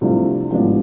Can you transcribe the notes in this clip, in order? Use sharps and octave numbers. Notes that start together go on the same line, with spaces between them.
C2 C3 F3 A3 D4
A1 G#2 F3 B3 D4